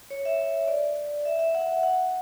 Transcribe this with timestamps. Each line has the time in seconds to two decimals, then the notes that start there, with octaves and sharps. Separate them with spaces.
0.10 C#5
0.25 E5
0.68 D5
1.25 E5
1.39 E5
1.55 F#5
1.83 F#5